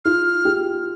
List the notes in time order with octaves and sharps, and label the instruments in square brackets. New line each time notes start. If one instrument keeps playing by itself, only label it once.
[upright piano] F4 [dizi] F6
[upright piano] G4